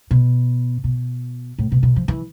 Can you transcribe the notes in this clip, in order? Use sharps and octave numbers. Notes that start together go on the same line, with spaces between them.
B2
B2
A2
B2
B2
F3
E3